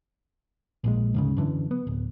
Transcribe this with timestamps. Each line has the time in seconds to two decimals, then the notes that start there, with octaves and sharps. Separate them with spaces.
0.84 A#1 A#2 G#3
1.14 D2 G#2 C#3
1.37 F#2 D3 E3
1.71 B3
1.87 D1